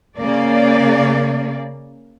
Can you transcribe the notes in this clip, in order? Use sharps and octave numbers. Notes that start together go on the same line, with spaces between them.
C#3 A#3 D5